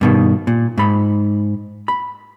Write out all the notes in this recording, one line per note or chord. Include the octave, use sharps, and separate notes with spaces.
G2 B2 D#3
A#2
G#2 B5
B5